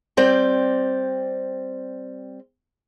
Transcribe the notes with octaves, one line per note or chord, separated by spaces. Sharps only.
G3 C4 D5 G5